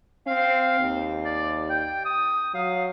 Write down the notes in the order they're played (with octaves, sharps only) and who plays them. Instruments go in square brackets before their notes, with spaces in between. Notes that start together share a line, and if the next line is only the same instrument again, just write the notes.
[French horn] C4 [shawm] F5
[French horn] D#2
[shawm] D5
G5
D#6
[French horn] F#3 [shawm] F5